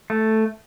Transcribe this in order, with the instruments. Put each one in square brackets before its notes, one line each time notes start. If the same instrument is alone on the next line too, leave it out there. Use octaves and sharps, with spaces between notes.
[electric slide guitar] A3